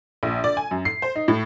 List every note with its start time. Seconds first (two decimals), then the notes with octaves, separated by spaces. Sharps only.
0.23 A#1
0.44 D5
0.57 G#5
0.71 F#2
0.85 C7
1.02 C5
1.16 D#4
1.28 A2